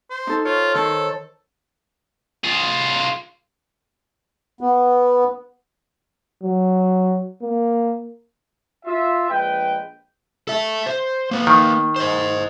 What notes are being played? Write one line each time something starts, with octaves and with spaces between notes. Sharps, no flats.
C5
D#4 A4
F4 C5 C#5
D#3 A4 C5 C#5
F4 G#4
B3
F#3
A#3
F4 E5
A#1 G#3 B4 G5
A4 E5
C5
A#3 B4
D#3
C5 D#5